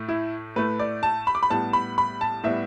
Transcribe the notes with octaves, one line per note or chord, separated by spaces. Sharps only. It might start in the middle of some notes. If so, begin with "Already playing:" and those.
Already playing: A2 A3
E4
A2 A3 B4
D5
A5
B5
D6
B5
A2 G3 B3 A5
B5
B5
A5
A2 G3 B3 E5